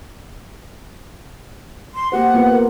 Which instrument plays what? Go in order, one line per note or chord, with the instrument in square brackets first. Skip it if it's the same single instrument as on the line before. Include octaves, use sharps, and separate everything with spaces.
[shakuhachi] C6
[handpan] A#3 G4 C5 [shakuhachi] F#5
[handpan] A#3 B3 F4
A#4